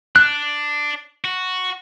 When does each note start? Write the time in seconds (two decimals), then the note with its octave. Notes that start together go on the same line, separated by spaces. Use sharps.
0.16 D4 F#6
1.24 F#4